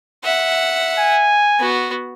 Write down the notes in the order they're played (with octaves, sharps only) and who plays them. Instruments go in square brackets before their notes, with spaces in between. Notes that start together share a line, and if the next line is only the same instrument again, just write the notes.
[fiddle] E5 F#5
[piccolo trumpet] G#5
[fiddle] B3 F#4